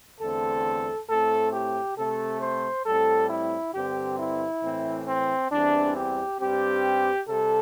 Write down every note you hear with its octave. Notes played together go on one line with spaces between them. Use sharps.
E2 D3 A3 C4 A4
A2 A3 C4 A4
G4
C3 A3 C4 A4
C5
A2 G3 C4 A4
E4
G2 D3 C4 G4
E4
A2 E3 C4
C4
E2 E3 G3 C4 D4
G4
G2 G3 C4 G4
C3 G3 A4